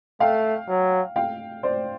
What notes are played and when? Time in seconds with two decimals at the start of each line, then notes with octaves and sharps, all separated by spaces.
0.20 A3 F5 G5
0.69 F#3
1.16 F5 G5
1.63 C5 D5